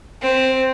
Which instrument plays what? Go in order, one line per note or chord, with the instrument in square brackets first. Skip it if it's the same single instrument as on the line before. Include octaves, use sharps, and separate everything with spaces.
[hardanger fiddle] C4